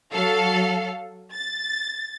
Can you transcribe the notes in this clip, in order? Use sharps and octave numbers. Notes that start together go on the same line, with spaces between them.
F#3 A4 F5
A6